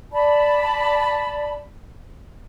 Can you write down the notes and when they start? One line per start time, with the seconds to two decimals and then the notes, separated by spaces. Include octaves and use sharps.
0.13 D5 A5 B5